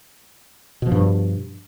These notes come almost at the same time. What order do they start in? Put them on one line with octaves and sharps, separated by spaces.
B2 F3 G2